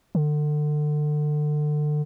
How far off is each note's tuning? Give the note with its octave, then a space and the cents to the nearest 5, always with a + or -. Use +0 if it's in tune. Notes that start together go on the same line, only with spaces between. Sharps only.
D3 +30